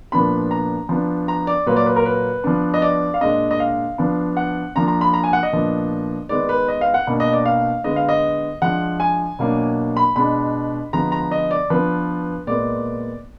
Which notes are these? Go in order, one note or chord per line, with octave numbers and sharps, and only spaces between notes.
A#2 F3 B3 D4 B5
A#5
F3 B3 D4
A#5
D5
A#2 F#3 A#3 B4
D5
B4
A#4
B4
F3 B3 D4
D#5
D5
F5
A#2 G#3 D4 D#5
D#5
F5
F3 B3 D4
F#5
F3 A#3 D4 A#5
A#5
B5
A#5
G#5
F#5
D#5
A#2 F3 B3 D4
D#3 G#3 B3 D5
B4
D#5
F5
F#5
B2 A#3 D4
D#5
D5
F5
D3 G#3 B3 D#5
F5
D#5
F3 G#3 D4 F#5
G#5
B2 F#3 A#3 D4
B5
B2 G#3 D4 B5
D3 F3 G#3 B3 A#5
A#5
D#5
D5
F3 B3 D4 B4
A#2 G#3 B3 D5